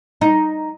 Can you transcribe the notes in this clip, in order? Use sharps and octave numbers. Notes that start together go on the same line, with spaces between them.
D#4